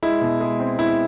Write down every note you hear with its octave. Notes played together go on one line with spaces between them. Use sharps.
G#3 E4
B2
G#3
C4
G#3 E4